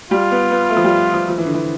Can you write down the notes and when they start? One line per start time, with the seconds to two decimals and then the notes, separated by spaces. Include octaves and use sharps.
0.11 G3 F4
0.31 B3
0.51 B3
0.70 A3
0.77 F3
0.84 G3
1.14 F3
1.29 F3
1.38 E3
1.46 D3
1.54 E3